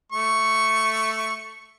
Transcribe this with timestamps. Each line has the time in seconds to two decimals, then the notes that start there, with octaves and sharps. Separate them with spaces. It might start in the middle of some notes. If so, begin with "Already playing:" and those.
0.12 A3 C#6